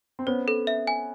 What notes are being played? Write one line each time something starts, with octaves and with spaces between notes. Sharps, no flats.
C4
B3 C#4 C5
A4
E5
G#5